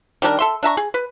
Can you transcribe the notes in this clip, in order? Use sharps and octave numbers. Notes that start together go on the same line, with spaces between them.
D#3 G3 D4 A#4
A4 E5 C6
D4 E5 A#5 C#6
G#4
B4